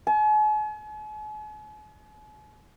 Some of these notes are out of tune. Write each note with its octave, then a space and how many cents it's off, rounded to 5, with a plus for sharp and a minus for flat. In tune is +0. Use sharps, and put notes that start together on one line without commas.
G#5 +45